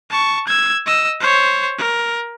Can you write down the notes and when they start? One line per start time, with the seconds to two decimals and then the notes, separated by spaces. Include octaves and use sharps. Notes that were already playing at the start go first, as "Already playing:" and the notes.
0.10 A5 C#6
0.47 E6 G#6
0.86 D#5 E6
1.20 C5 C#5
1.78 A#4